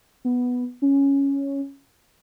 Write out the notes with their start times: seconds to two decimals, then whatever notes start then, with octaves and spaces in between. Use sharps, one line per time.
0.25 B3
0.82 C#4